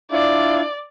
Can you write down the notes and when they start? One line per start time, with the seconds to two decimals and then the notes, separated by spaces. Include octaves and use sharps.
0.11 D4 E4 F4 D5